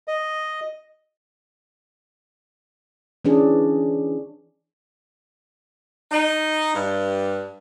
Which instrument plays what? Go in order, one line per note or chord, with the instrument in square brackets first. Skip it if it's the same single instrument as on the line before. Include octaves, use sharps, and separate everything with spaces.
[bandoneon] D#5
[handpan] E3 C#4 D4 G#4
[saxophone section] D#4
G2